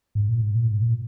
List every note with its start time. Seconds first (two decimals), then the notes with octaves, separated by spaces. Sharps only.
0.15 G#2
0.29 A#2
0.42 G#2
0.55 A#2
0.69 G#2
0.82 A#2